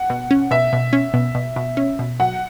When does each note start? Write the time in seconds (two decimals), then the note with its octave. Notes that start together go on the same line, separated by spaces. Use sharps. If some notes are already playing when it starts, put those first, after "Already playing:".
Already playing: F#5
0.10 B2
0.31 C#4
0.51 B2 E5
0.73 B2
0.93 C#4
1.14 B2
1.35 B2
1.56 B2
1.77 C#4
1.99 B2
2.20 F#3 F#5